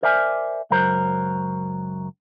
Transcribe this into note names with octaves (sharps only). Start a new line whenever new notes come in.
A#4 C5 D5 E5 G#5
C#2 F#2 F#3 A#4 C5